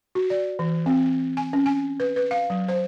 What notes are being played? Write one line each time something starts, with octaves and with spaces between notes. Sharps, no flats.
F#4
D5
E3
C4
G#5
C#4
G#5
B4
B4
F5
F#3
C5